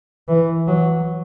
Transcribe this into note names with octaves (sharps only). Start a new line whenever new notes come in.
E3
F#3